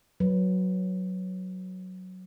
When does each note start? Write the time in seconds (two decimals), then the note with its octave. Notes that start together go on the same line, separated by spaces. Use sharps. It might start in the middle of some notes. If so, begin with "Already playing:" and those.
0.20 F#3 B4